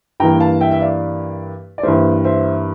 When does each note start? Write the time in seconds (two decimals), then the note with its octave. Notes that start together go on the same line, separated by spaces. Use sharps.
0.20 G2 E3 A#3 G5 A#5
0.40 F5 A5
0.61 E5 G5
0.71 E5
0.81 D5 F5
1.78 D5
1.83 G2 E3 G3 A#3 C5 E5
2.24 C5 E5